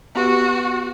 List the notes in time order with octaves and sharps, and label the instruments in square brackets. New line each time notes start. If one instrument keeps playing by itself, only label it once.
[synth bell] B3 G4 B4 [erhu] F#4